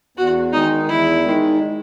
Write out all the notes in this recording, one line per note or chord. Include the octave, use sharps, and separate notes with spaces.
E2 F#4
D#3 G#3 D#4
E2 E4
D#3 G#3